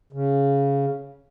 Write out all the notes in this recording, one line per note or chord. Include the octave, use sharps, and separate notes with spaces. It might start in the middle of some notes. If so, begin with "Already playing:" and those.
C#3